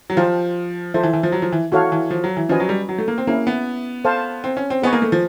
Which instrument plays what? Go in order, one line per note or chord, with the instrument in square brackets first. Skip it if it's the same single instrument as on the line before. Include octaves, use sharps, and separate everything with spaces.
[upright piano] F#3
[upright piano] F3 [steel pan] G4 C5 F5 A5
[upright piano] F3 [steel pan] A4 C5 E5
[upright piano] E3
E3
F3
F#3
F3
E3
[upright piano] E3 [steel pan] F#4 A4 C#5 F5
[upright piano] E3
F3
F#3
E3
[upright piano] F3 [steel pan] C#4 F#4 B4 D#5 G#5
[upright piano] F#3
G3
F#3
A3
A#3
C4
[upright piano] A#3 [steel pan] C#4 E4 G#4
[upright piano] B3
[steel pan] A4 C5 F5 A5
[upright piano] C4
C#4
C4
[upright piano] B3 [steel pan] G#4 B4 D#5 G#5 C#6
[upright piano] A#3
A3
F3